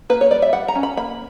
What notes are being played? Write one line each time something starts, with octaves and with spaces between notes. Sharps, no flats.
A#3 B4
C#5
G3 D5
E5
G3 F#5
A#5
C#4
B5
A#3 B5